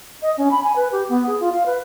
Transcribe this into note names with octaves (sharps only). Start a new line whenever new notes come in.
D#5
C#4
B5
G#5
B4
G4
B3
G#4
F4
F5
B4